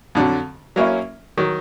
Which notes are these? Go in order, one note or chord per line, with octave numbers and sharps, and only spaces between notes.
F2 D3 F#3
F#3 A#3 C#4 E4
D#3 F#3